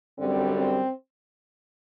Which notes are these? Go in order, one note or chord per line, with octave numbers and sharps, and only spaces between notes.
F#2 D3 G3 C4
C4